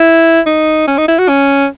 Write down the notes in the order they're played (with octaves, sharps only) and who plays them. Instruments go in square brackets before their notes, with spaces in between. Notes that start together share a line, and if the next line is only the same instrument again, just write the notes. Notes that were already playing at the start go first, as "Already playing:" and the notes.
Already playing: [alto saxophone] E4
D#4
C#4
D#4
E4
F#4
C#4